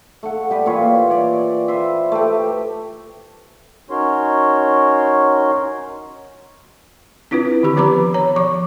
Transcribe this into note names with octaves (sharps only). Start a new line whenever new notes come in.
A3 F#5
G3 G4 B4
A#2 E3 F4 C#5
C#5 D5
B4 C5 E5
A3 G4
C#4 D#4 F#4 A#4 C#5 C6
C4 D4 E4 F4 B4
D3 D#3 G4 B5
F3 B3 B4 A#5 B5 D6
C#5 A#5
F3 C#6